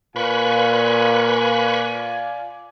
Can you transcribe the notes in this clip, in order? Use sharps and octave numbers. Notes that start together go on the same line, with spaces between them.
A#2 F4 B4 D5 G#5 B5 C#6